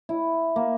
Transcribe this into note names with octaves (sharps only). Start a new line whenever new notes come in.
E4
A#3